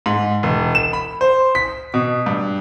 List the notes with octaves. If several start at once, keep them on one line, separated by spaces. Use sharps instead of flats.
G#2
E1
E7
B5
C5
B6
B2
G2